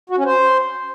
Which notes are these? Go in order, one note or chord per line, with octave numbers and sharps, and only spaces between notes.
F#4
C#4
C5